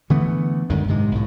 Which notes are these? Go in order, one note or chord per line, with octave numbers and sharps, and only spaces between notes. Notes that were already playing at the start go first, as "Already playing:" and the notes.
D3 E3 A3 B3
F#2 D3 D#3 G#3
G#2 C3 G#3
B1 A2